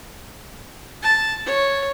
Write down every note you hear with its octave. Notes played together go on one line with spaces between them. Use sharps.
A5
C#5